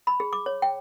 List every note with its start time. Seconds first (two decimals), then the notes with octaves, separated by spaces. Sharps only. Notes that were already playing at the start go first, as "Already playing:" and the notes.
0.07 B5
0.20 G#4
0.33 D6
0.46 C#5
0.62 G5